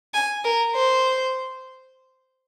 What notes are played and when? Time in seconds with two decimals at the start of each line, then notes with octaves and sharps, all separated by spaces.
0.14 G#5
0.44 A#4
0.75 C5